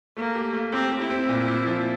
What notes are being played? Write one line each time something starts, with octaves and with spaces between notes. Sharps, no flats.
A3 A#3
G4
A3
C4 G4
G4
E4
C4
A#2
A#2
F3